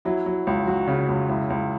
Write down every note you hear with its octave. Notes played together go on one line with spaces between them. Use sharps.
F#3 E4
F#3
C#2
F#3 F#4
C#3
C#2
C#2 E4
C#2